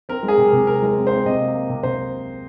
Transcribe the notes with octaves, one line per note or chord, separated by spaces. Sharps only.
C4 A#4
G#3
G#4
C3
A#4
C3
C4 A#4
G#3 A#4
C4
C4 C5
C3 D#5
A#3
A#3
C3
C3 C5